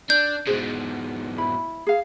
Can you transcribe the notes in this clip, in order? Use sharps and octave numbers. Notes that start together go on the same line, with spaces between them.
D4 G6
G#2 B2 G#4 C5
E4 B5
G#4 F5